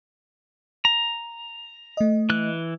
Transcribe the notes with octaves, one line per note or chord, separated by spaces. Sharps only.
A#5
A3 D#5
E3 F#6